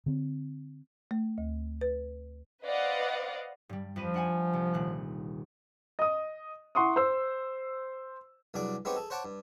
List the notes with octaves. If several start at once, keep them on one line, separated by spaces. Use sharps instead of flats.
D3 C4
A3
D2
B4
B4 C5 D5 D#5 F5 F#5
G2 G3
F2 F3 B4 D#7
D4 F#5 G#5
C2
D#1 F#6
D#5 D#6
E4 F#5 C6 C#6 D#6
C5 E6
C2 G2 F#3 G#4 D5 D6
G#3 B3 C4 D#4 G4 C#5
G#4 A4
C5 C#5 F#5 A5 D6
G2